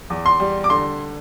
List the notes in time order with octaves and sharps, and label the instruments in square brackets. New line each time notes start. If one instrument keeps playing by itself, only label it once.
[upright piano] E2
C6
G3
D6
D3 C6